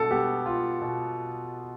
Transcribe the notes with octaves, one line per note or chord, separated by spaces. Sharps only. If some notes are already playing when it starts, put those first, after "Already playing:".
Already playing: B2 A4
B3 G4
F4
B2